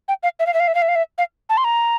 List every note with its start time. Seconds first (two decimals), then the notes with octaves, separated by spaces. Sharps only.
0.08 G5
0.23 F5
0.39 E5
0.46 F5
0.54 E5
0.60 F5
0.68 E5
0.75 F5
0.82 E5
0.88 F5
0.95 E5
1.18 F5
1.49 A5
1.57 C6
1.64 A#5